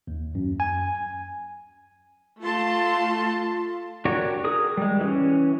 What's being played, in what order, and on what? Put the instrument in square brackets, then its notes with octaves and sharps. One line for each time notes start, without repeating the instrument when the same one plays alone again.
[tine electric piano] D#2
F#2
G#5
[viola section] A3 A5 C6 [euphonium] F4
[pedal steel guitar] D4 F#4 G4 A#4 C#5
G#4 A#4 D#6
G3 G#3
E3 C#4